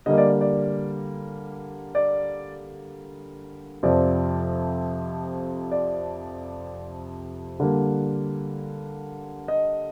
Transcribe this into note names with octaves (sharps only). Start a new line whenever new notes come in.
D3 G3 A#3 D#5
D5
D5
D5
F2 C3 F3 C4 D5
D5
D3 G3 A#3
D#5